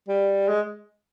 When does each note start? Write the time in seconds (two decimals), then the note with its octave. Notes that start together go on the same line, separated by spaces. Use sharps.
0.08 G3
0.48 G#3